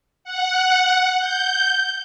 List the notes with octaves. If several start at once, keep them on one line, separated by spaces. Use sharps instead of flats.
F#5
G6